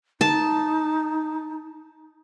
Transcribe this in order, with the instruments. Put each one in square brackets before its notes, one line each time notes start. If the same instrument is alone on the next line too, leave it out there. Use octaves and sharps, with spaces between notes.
[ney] D#4 [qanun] A5